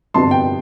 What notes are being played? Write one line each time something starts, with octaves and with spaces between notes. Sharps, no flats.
G1 F2 C3 F3 B3 A5 C6
G5